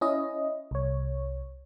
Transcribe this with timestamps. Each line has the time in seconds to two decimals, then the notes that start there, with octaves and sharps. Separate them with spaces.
0.01 C#4 E4 D#5
0.71 C2 C#5